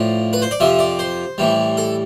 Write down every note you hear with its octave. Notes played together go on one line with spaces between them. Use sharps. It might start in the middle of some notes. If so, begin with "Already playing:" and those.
Already playing: A2 F3 D5
B4
C5
D5
F2 C3 F3 E5
D5
C5
A2 E3 G3
A4